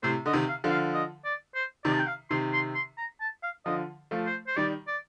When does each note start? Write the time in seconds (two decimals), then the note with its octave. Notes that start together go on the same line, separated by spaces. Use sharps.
0.03 A2 C3 C5
0.26 D3 D#5
0.33 C3 D#3
0.49 F5
0.64 D3 F3
0.71 F5
0.94 D#5
1.25 D5
1.55 C5
1.84 C3 D#3 D5
1.93 A5
2.00 G5
2.07 F5
2.30 C3 D#3 C6
2.54 C6
2.75 C6
2.98 A#5
3.21 A5
3.43 F5
3.66 D3 F3 D#5
4.11 F3 A3
4.26 C5
4.47 C5
4.56 D#3 G3 D5
4.88 D5